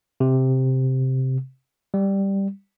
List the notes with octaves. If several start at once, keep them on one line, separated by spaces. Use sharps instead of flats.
C3
G3